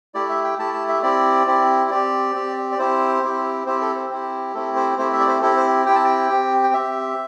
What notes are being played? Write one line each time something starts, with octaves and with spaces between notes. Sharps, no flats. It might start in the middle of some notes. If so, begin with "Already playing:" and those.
A3 E4 G4 D5
E5
G5
A3 E4 G4 A5
A5
E5
C4 E4 G4 D5
C4 E4 G4
C4 G4 D5
C4 G4
D5
C4 E4 G4 C5
C4 E4 G4
C4 E4 G4 C5
A4
C5
C4 E4 G4
A3 C4 E4 G4 A4
C5
A3 C4 E4 G4 C5
E5
D5
C5
C4 E4 G4 A4
C5
C4 E4 G4 G5
A5
G5
C4 G4
G5
C4 G4 E5